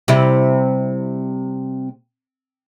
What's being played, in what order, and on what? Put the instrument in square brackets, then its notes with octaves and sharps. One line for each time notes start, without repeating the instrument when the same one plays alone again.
[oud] C3 G3 E4